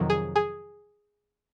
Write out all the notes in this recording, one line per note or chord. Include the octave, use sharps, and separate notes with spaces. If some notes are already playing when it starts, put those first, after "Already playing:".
Already playing: F2 C3 D#3 F#3
G#4
G#4